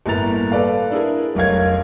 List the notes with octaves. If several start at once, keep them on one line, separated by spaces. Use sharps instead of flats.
G1 A2 A#3 A#5 A6 F7
A4 B4 D5 F5
D4 E4 G#4 A#4
F1 B1 A#4 C#5 F5 G#6